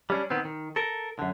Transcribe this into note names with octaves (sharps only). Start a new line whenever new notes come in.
G3 C#4 D4
D#3 B3 C4
D#3
A4 A#4
F#2 D3